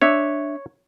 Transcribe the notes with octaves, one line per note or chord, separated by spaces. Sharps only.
D4 C#5 E5